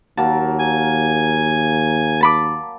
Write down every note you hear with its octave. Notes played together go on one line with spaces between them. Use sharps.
D#2 F#3 A#3 A5
G#5
A5 B5 D6